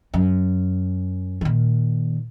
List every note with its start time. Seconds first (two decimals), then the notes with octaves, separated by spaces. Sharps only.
0.14 F#2
1.41 A#2 D#3